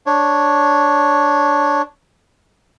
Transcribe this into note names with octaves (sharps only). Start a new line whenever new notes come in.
D4 C#5